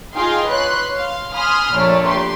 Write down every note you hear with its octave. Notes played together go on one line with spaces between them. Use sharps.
D#4 F4 G#4 F5 G5 C6
B4 C#5 C6 F#6
F5 C6
G#5 B5 C6 D#6 F6
A#1 A#2 A3 C#5 D5
G4 B4 C6